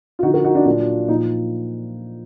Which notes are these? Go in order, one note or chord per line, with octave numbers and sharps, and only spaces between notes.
F4
D3 F3 D#4 F#4
F#4 A#4
D#4 F#4
D4 F4
A#2 F#3 D4 F4
A#2 F3 D#4